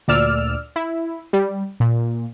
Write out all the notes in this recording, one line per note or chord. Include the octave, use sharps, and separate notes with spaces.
D2 A#2 D5 E6 F6
E4
G3
A#2